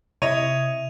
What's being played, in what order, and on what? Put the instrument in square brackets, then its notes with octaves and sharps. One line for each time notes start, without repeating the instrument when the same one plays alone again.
[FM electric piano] C3 [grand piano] E4 [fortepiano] C#5 D#5 [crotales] D#7 F7